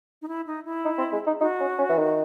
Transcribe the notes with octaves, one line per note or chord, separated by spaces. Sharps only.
D#4
E4
D#4
E4
D#4
C4
G#3
D#4
D#4 F#4
C#4
C#4
E3
D#3